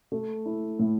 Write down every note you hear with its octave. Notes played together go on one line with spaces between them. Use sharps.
A3
E4
A2